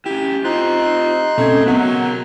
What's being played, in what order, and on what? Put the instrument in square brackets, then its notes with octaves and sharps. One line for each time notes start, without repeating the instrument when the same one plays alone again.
[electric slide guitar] C#4 E4 [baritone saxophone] G4
[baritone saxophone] C4 [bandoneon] D#4 C6 F#6 [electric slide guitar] F4 G4
[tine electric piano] B2 C#4 G#6 [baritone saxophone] A3 [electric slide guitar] C4
[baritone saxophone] F#3 [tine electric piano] B3 [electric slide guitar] G#4 A#4 F#5